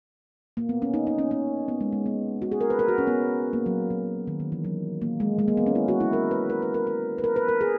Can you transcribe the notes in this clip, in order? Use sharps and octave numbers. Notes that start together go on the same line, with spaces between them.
A#3
B3
C#4
D#4
D#4
C#4
C#4
B3
G#3
G#3
B3
F#4
G#4
A#4
B4
A#4
F#4
C#4
B3
A#3
F#3
F#3
D#3
D#3
E3
F#3
A#3
G#3
G#3
A#3
B3
C#4
E4
F#4
E4
A#4
B4
A#4
B4
A#4
A#4
B4
A#4
B4
A#4
G#4